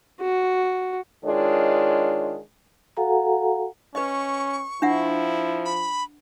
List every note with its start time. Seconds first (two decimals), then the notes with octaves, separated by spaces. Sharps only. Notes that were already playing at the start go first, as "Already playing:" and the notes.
0.21 F#4
1.25 D#3 G#3 D4 F4 C#5
2.97 F#4 A4 F5 F#5 G#5 A#5
3.95 C#4 B4 D#5 C#6
4.82 F3 D4 E4 E5 F#5
5.65 B5